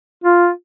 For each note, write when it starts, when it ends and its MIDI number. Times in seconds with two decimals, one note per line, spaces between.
0.24 0.49 65